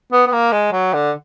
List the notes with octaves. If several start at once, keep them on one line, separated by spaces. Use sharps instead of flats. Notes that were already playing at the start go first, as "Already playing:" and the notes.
B3
B3
A#3
G#3
F#3
D3